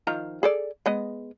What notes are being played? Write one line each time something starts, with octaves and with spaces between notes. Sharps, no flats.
D#3 F3 A#5
G#4 A4 D5
G#3 B3 D#5